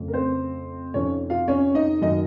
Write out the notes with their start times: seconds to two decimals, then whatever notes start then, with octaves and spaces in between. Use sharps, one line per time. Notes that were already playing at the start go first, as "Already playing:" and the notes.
Already playing: F2 C#3 A3
0.08 A#4
0.13 C4 C5
0.94 F2 C3 F3 C4 C#4 D#4 C#5
1.30 F4 F5
1.48 C#4 C#5
1.75 D#4 D#5
2.01 F#2 D#3 F#3 A#3 D#4 D#5